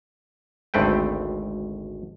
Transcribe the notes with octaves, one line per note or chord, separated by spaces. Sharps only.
G#1 D2 A3 C4 B4 G5